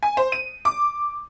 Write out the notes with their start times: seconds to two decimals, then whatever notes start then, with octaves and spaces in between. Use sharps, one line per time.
0.03 G#5
0.17 C5
0.32 D#7
0.65 D6